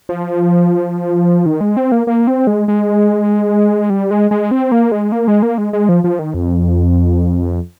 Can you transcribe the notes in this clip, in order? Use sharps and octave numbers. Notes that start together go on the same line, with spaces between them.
F3
D#3
G#3
C4
A#3
A#3
C4
G#3
G#3
G3
G#3
G#3
C4
A#3
G#3
A#3
G#3
A#3
G#3
G#3
F3
F3
D#3
F2